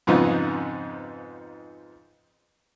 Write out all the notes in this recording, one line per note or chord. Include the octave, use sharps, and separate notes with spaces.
F2 G#2 C#3 F3 B3 D#4